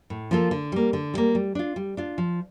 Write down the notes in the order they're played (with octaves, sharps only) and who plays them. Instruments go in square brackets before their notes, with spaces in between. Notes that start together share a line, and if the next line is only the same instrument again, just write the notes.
[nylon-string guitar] A2
F3 A#3 F4 A4
D3
G3 A#3
D3
G3 A#3
G3
D4 F4
G3
D4 F4
F3